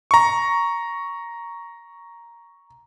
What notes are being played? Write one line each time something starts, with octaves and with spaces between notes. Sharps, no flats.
A#5 C#6